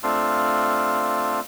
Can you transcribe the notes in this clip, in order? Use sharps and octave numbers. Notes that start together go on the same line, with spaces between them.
A3 C4 D4 F4 F5